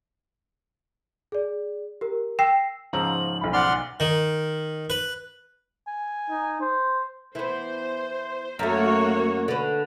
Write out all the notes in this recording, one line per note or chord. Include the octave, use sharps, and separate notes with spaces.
G#4 D5
G4 A#4
G5 E6 A#6 C7
G#2 C#3 F3 A#5 E6 F#7
B1 B5
D5 F#5 C6 F6
D#3
B4
G#5
D#4
C5
E3 B3 C5
F#2 A3 A#3 F#4 C#5
D3 B4